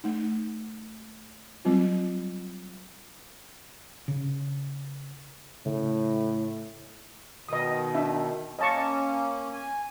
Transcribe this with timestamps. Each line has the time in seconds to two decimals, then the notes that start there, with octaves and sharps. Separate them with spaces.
0.04 A3 D#4
1.65 F#3 G3 C4 F4
4.08 C#3
5.66 A2 C#3
7.49 B2 D#3 D#5 D#6
7.95 D4 D#4 E5
8.59 A#3 C#4 D#5 A5 C#6
9.53 G#5